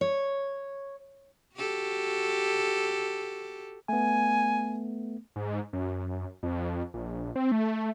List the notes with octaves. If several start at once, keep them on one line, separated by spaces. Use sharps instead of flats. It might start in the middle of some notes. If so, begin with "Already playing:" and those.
C#5
F#4 G4 A4
A3 B3 G#5
G#2
F#2
F2
A#1
C4
A3